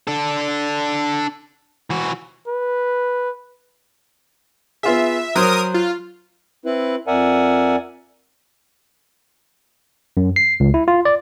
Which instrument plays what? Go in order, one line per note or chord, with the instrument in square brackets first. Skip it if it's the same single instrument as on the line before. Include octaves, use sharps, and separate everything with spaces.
[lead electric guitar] D4 A4
E3 F#4
[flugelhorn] B4
[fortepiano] B3 F4 G#4 [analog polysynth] E5
[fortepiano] F#3 C5 [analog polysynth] A#4 D#6
[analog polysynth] F4
[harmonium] C4 E4 B4
F2 A#4 D5 E5 F#5 G#5
[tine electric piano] F#2
C7
C#2
E4
F4
D5